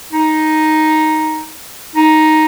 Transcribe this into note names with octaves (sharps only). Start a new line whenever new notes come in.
D#4
D#4